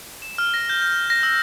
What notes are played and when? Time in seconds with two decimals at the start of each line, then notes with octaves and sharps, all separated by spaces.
0.22 E7
0.38 F6
0.54 A#6
0.70 G6
0.82 G6
0.96 A#6
1.10 A#6
1.23 E6